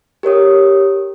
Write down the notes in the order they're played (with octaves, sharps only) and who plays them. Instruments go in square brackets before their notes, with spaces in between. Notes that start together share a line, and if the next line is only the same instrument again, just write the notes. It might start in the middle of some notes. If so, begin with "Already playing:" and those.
[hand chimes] G4 A#4 C#5 D#6